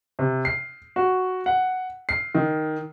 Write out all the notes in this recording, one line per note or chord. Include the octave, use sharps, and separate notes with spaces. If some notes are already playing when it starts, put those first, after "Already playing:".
C3
C7
F#4
F#5
C7
D#3